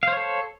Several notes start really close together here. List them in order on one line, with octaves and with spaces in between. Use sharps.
F5 C5 C#5 A4